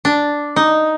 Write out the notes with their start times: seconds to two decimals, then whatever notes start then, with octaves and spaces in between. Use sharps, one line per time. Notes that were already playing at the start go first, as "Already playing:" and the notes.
0.05 D4
0.56 D#4